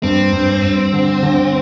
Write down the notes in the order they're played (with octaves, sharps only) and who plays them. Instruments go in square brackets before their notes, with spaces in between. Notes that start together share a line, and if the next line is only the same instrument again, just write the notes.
[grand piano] G2 [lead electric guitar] C4
[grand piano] G2
G2
D3
D3